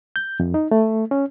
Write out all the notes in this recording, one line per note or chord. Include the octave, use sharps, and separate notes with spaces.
G6
F2
D#4
A3
C#4